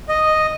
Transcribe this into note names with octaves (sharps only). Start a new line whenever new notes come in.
D#5